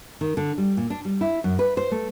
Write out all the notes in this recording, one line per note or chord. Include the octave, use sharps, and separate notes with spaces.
D#3
D3
G3
A#2
D4
G3
E4
F#2
B4
C5
A3